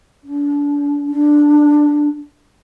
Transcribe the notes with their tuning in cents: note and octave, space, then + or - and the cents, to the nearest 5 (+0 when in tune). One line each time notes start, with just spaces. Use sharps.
D4 -30
D4 +0